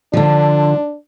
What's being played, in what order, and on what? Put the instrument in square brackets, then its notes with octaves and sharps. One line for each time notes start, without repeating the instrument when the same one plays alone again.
[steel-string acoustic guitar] D3 F3 [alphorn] D4